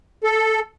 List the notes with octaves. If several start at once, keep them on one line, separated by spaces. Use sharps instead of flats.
A4